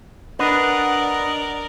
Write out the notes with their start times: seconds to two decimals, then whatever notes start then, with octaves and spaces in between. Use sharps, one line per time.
0.39 D4 A#4 B4 D5 D#5 F#5